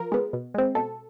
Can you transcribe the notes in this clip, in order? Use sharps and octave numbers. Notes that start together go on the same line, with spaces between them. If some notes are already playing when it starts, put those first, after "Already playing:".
Already playing: F3 A#4
G#3 B3
B2
G#3 C4
B2 A4